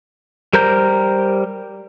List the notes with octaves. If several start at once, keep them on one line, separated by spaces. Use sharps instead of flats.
G3 A#4 C5 A#5 G6